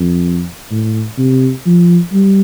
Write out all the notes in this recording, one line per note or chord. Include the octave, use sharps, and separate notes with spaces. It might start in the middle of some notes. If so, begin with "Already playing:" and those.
Already playing: F2
A2
C3
F3
G3